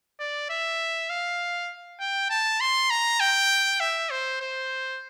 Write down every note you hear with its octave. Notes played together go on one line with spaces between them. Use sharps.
D5
E5
F5
G5
A5
C6
A#5
G5
E5
C5
C5